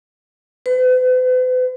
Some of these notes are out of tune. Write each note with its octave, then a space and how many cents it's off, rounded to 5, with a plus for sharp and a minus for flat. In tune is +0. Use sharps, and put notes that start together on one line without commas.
B4 +45